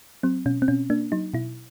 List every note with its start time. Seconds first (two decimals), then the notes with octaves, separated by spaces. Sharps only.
0.23 F#3 C4
0.46 B2 C#4
0.62 C4
0.68 B2 C#4
0.90 A#3 D4
1.12 F#3 D#4
1.34 B2 E4